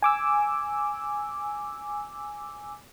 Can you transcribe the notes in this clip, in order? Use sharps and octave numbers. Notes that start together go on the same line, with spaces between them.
G#5 D6 E6